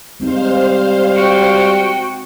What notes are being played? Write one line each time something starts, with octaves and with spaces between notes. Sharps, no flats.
G3 G#3 C4 D#4 C5 F5
F#4 G5